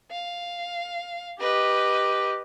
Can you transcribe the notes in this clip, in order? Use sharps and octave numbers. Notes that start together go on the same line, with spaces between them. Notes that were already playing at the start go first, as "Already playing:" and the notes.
F5
G4 B4 D#5